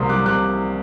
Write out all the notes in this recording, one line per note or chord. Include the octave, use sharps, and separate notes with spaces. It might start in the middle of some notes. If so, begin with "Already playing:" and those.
Already playing: C2 C3 A#3 C6 D#6
G3 D6 F#6
C3 D6 F#6